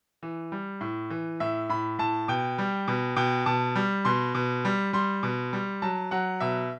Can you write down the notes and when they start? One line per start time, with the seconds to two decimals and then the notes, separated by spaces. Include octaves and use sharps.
0.23 E3
0.52 G3
0.81 A2
1.10 E3
1.40 A2 E5
1.70 A2 B5
1.99 A2 A5
2.28 B2 G5
2.58 G3
2.88 B2
3.16 B2 G5
3.46 B2 A5
3.76 G3
4.05 B2 C6
4.35 B2
4.65 G3
4.93 G3 C6
5.23 B2
5.53 G3
5.82 F#3 A5
6.11 F#3 F#5
6.40 B2 E5